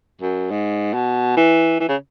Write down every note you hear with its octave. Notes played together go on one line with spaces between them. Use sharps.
F#2
G#2
B2
E3
E3
C#3